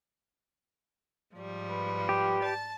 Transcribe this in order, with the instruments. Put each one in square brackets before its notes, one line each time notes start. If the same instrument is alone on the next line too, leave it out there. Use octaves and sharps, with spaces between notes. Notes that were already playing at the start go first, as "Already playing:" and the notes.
[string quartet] G#2 F3 G3
[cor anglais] B4
[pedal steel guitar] G4
[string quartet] A5 A6